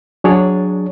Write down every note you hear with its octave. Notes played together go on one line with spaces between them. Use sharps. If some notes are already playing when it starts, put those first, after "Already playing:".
F#3 D4 G#4 C#5 D5